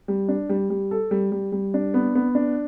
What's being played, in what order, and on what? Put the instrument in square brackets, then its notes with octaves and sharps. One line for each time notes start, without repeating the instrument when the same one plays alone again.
[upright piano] G3
D4
G3
G3
A4
G3
G3
G3
D4
B3
B3
D4